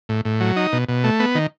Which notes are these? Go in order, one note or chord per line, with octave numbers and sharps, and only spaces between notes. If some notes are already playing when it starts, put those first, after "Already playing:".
A2
A2
F#3
D#4
B2
B2
A3
B3
D#3